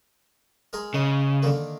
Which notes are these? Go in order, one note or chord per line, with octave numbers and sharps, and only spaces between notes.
G#3 G#4 A#4
C#3 G#3
D3 D#3 A#3